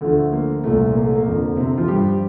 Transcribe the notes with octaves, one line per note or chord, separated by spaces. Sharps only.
D2 D3 F3 A3
A#3
C2 A#2 F3 A3
A#3
A3
A#3
F2 D3 F3
C3 C4
F3 F4
G2 F3 G3 G4